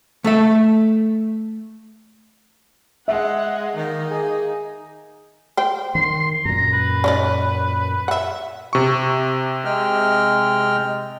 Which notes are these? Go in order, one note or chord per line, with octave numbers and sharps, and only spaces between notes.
A3 A4 E5
G#3 E5 F#5
D#3 A#3 D#4
G#4
C5 G5
D#3 C6
F#2 A#2 A#5
B4
C#4 D#4 D5
E5 F#5
C3 C#6
G#3 G5 F6